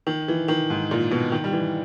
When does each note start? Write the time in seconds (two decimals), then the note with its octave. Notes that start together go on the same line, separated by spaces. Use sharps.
0.07 D#3
0.28 E3
0.48 D#3
0.70 G#2
0.91 A#2
1.11 B2
1.32 D#3
1.44 G3
1.53 E3